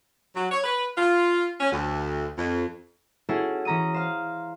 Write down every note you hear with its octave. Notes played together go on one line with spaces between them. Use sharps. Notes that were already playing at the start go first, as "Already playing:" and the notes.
F#3
C#5
B4
F4
C#4
D2
F2
C#4 E4 F#4 G#4 A4
E3 C#4 A#5 D#6 D#7
C5 F5